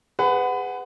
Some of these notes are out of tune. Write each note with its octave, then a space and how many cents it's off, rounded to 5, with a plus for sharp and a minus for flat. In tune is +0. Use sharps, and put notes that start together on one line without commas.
G#4 -20 B4 +25 F#5 +0